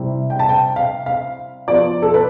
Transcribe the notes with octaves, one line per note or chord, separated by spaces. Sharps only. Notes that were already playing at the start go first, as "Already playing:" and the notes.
Already playing: C3 G3 C4 E4
G5
A5
G5
F5
F5
F3 B3 F4 D5
A4
B4